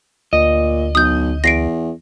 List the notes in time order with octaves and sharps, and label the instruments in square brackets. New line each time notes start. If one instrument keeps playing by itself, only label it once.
[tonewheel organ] D2 [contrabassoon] A#2 [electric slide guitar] D#5
[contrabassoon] B1 [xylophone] D#6 G6
[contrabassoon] E2 [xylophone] A#6 C7 D7